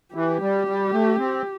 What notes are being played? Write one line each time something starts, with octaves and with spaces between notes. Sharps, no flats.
E3 G4
G3
G3
A3
C4